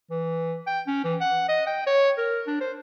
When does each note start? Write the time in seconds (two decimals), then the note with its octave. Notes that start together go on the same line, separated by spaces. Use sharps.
0.11 E3
0.67 G5
0.87 C#4
1.04 E3
1.20 F#5
1.49 D#5
1.67 G5
1.87 C#5
2.18 A#4
2.47 D4
2.61 C5